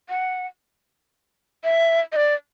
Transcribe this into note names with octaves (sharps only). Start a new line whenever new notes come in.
F#5
E5
D#5
D5